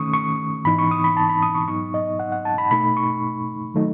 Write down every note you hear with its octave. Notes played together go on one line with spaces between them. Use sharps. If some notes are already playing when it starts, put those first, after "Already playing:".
Already playing: D#3 A3 C#4 C#6 D#6
C#6
G#2 E3 B3 D#4 B5
C#6
D#6
B5
A5
B5
D#6
C#6
G#2 F#3 B3 D#4 C#6
D#5
F#5
F#5
A5
B5
B2 A3 D#4 B5
C#6
D#3 F#3 A3 D#4